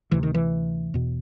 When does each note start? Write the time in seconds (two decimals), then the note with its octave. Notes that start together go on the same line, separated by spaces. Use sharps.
0.11 D2 C3 E3
0.23 D#3
0.34 E3
0.94 E2 B2